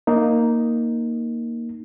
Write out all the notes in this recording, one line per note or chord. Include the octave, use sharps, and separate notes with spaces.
A#3 D#4